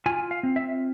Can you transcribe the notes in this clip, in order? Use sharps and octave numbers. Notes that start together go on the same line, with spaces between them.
F4 G#5
F5
C4
E5